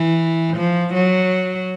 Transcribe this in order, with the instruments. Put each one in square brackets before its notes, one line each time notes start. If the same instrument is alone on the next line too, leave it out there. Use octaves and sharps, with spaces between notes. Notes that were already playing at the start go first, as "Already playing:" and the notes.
Already playing: [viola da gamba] E3
F3
F#3